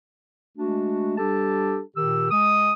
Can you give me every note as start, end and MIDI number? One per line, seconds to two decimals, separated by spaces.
0.57 1.17 56
0.57 1.17 57
0.57 1.17 62
0.57 1.17 66
1.18 1.80 55
1.18 1.80 62
1.18 1.80 67
1.18 1.80 69
1.18 1.80 81
1.96 2.31 46
1.96 2.31 51
1.96 2.31 67
1.96 2.31 88
2.31 2.73 56
2.31 2.73 87